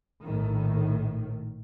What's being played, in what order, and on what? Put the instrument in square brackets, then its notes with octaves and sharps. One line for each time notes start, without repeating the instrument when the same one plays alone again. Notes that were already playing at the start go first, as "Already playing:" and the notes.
[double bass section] A#1 A2 D#3